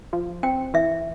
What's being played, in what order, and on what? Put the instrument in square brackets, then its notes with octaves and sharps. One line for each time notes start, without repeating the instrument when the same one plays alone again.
[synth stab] F3
[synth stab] C4 [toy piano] G5
[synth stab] E3 [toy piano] E5